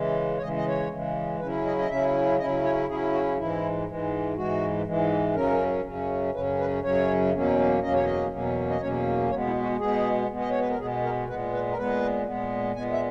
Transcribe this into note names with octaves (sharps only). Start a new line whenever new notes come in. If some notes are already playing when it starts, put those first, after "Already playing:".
Already playing: C#3 E3 G#3
C#5
C#3 E3 G#3 D#5
D#5
C#5
C#3 E3 G#3
C#3 F#3 C#4 E4 B4
D#5
D#5
C#3 F#3 C#4 E4 E5
C#3 F#3 C#4 E4 D#5
C#5
C#3 F#3 C#4 E4 G#4
F#4
G#2 E3 G#3 E4
G#2 E3 G#3
G#2 E3 G#3 F#4
G#2 E3 G#3
F#2 C#3 F#3 C#4 A#4
F#2 C#3 F#3 C#4
F#2 C#3 F#3 C#4 B4
B4
F#2 C#3 F#3 C#4 C#5
E2 B2 F#3 A#3 C#4
E2 B2 F#3 A#3 C#4 D#5
C#5
D#5
E2 B2 F#3 A#3 C#4
D#5
E2 B2 F#3 A#3 C#4 C#5
B2 G#3 B3 C#5
E4
F#4
B2 G#3 B3 G#4
B2 G#3 B3
D#5
C#5
B4
A#4
B2 G#3 B3 G#4
A#4
A#2 G#3 B3 B4
B4
A#4
A#2 G#3 B3 B4
A#2 G#3 B3
A#2 G#3 B3 G#5
E5